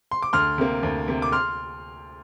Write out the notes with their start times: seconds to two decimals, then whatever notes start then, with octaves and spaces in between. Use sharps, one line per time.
0.11 C6
0.22 D6
0.33 D2 C6 F6
0.58 C3 A#3
0.83 D2
1.08 C3 A#3
1.22 D6
1.32 C6 F6